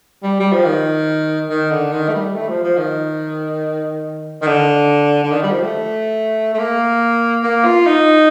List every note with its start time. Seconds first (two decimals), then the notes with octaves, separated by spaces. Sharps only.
0.23 G3
0.40 G3
0.53 F3
0.65 D#3
1.50 D#3
1.71 D3
1.92 D#3
2.08 A3
2.14 G3
2.35 A3
2.49 F3
2.63 F3
2.77 D#3
4.42 D#3
4.47 D3
5.23 D3
5.32 D#3
5.43 G3
5.52 F3
5.63 A3
6.54 A3
6.59 A#3
7.44 A#3
7.65 F4
7.86 D#4